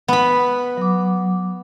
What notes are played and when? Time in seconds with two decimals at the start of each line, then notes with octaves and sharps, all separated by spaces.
0.08 B3 B5
0.77 F#3 D6